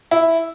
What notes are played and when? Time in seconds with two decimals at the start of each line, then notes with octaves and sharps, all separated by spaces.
0.11 E4